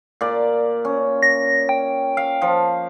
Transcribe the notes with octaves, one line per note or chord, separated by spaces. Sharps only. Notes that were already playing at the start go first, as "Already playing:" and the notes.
A#2 D5
C#4
A#6
G5
F5
F3